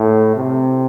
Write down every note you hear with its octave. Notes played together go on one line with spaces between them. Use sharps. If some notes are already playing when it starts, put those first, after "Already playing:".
Already playing: A2
C3